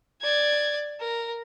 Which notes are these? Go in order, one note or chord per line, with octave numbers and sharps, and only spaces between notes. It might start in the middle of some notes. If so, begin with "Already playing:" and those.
D5 G#6
A#4